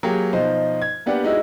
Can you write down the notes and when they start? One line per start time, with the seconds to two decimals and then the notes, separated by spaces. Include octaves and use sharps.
0.03 F#3 A#3 G4 G#4
0.33 B2 F3 D#4 C5
0.82 G#6
1.06 A#3 B3 D4 G4 D5 F#5
1.23 G#3 D#4 E4 F#4